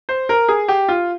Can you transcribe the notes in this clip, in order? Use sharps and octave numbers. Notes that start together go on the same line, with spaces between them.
C5
A#4
G#4
G4
F4